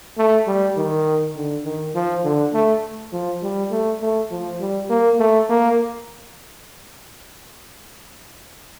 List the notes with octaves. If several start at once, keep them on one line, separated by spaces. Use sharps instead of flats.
A3
G3
D#3
D3
D#3
F3
D3
A3
F3
G3
A3
A3
F3
G3
A#3
A3
A#3